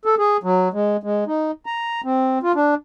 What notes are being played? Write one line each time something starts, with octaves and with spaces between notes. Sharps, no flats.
A4
G#4
F#3
G#3
G#3
D#4
A#5
C4
F4
D4